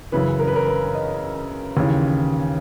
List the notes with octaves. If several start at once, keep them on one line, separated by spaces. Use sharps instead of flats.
F#2 C#3 E3 B4
A#4
B4
A#4
B4
D#5
D#2 C#3 E3